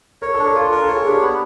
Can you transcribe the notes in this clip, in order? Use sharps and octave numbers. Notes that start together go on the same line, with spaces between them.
A#4 C#5
A4
D4
A#4
F4 A4
A4 A#4
A4
C#5
G#4
D4 G4
B3